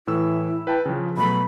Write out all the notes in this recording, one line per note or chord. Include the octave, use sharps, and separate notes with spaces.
A2 E3 E4 E6
B4 G5 A5
C#3 F3
B2 F#3 A3 B5